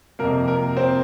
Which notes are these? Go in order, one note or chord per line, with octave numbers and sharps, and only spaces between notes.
F2 C3 A#3 A#4
A#4
C4 C5